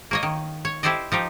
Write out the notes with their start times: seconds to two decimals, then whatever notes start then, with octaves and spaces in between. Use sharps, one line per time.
0.11 A#3 C#5 D#5
0.23 D#3
0.65 C#5
0.83 E4 G4 A4 C5 D5 D#5
1.12 F3 D#4 G4